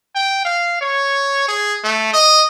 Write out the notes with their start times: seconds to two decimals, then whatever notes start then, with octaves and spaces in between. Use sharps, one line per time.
0.15 G5
0.45 F5
0.81 C#5
1.48 G#4
1.84 A3
2.13 D#5